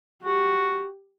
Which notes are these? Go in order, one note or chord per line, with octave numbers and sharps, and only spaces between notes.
F#4 G4